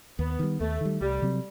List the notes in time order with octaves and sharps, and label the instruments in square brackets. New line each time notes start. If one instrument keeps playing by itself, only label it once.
[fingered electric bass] D#2 [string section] B3
[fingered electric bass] D#3 G3
[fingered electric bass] D#2 [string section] A3
[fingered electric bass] D#3 G3
[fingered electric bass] C2 [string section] G3
[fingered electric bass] C3 F#3 C4